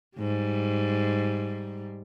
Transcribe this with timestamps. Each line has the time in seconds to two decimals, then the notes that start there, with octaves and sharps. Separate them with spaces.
0.17 G#2 G3